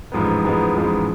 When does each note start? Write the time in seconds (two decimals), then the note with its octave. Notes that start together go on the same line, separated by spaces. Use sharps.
0.12 A1 G#2 F3 G#3 B3
0.44 A1 G#2 F3 G#3 B3
0.74 A1 G#2 F3 G#3 B3